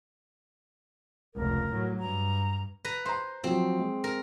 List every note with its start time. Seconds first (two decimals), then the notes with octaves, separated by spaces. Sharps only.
1.35 F1 C#2 A#4
1.70 A2 F#3
1.99 G2 A#5
2.85 B4 A#5
3.05 C5 A#5 C6
3.44 F3 F#3 C4
3.79 G#3
4.04 A#4